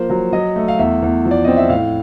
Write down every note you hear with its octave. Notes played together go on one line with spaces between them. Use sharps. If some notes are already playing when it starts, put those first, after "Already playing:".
Already playing: F3 A#3 C5
F#3
F#3 D#5
A3
F5
E2 E5
E2
F3
D5
C4 D#5
E5
A2 F5